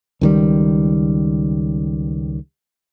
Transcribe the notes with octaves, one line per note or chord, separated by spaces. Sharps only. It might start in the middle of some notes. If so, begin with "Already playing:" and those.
C#2 D#3 G3